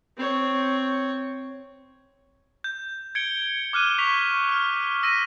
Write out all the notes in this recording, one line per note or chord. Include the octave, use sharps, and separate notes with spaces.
C4 C#5
G6
G#6 C#7 D7 G7
D6 F6 F#6 D#7
C#6 B6 F7
F6
E6 A#6 B6 D#7